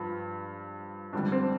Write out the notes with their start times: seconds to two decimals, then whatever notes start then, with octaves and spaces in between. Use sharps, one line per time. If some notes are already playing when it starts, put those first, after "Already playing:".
Already playing: G2 F3
1.13 F2 D3 G3 D4
1.32 C4